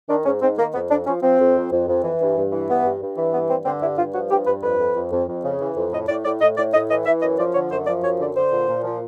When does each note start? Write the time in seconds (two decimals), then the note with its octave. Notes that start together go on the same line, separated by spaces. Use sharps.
0.09 D#3 D4
0.25 G#2 C#4
0.42 G#2 C4
0.58 D#3 A#3
0.74 F2 B3
0.90 F2 D4
1.06 F3 C#4
1.22 F3 C4
1.39 F2
1.55 F2
1.71 F2
1.88 F2
2.03 E3
2.20 G2
2.36 G2
2.52 E3
2.68 G2 B3
2.84 G2
3.01 G2
3.17 E3
3.33 G2 B3
3.50 G2 C4
3.65 D3 C4
3.82 G2 E4
3.98 G2 F4
4.14 F3 F#4
4.31 G2 G4
4.47 G2 B4
4.63 F2 B4
4.79 F2
4.96 F2
5.12 F2
5.27 F2
5.44 C#3
5.60 E3
5.76 F2
5.92 A2 D#5
6.08 A2 D5
6.25 A2 D5
6.41 A2 D#5
6.57 A2 D5
6.74 A2 D#5
6.89 E3 D#5
7.06 E3 E5
7.22 F#2 D#5
7.38 F3 D5
7.54 D3 C#5
7.71 F#2 C5
7.87 F3 D5
8.03 F#2 C#5
8.20 D3 D5
8.36 D3 C5
8.52 A#2
8.68 A#2
8.84 F3